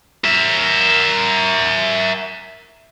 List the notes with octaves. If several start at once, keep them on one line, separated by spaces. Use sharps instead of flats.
A#4 E5